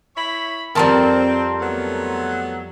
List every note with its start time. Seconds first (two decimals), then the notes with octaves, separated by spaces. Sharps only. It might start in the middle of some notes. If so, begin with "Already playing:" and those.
0.16 E4 C#5 B5
0.75 F2 F3 G3 C4 A#4 A5 C6
1.60 F#3 A3 B3